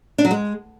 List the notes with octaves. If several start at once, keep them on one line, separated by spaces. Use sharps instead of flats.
D4
F#3
G#3